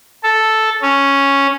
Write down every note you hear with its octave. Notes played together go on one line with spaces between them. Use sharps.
A4
C#4